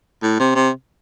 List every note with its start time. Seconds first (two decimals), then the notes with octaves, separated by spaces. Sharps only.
0.23 A2
0.39 C3
0.55 C3